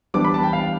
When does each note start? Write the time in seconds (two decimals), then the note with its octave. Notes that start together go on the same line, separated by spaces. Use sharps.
0.14 E3 G3 B3 D4 D6
0.25 B5
0.34 A5
0.43 G5
0.53 F5